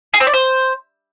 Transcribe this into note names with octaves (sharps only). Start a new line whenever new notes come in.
G#4
C4
D5
C5